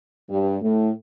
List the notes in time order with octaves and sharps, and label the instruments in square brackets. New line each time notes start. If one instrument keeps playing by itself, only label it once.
[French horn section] G2
A2